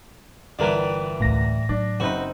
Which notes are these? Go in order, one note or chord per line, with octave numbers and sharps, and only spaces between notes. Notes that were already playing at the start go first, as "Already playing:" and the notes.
G1 E3 G3 D4 A#4 B4
F#1 D2 A2 A#6
F#3 D4
F#1 C4 D#4 F#4 B4